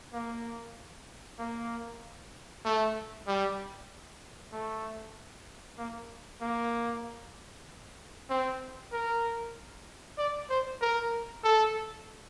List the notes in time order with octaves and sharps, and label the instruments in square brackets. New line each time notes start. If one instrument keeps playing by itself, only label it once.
[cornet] A#3
A#3
A3
G3
A3
A#3
A#3
C4
A#4
D5
C5
A#4
A4